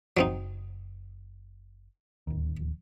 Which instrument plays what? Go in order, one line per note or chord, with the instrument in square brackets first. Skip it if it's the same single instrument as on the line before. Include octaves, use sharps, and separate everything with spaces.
[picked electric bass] F#1 [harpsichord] F#3 C4 D#4
[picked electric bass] D1 D#2